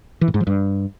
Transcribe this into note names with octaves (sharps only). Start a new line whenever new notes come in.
E3
A2
G#2
F3
G2